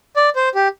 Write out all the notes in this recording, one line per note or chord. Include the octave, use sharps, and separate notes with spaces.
D5
C5
G4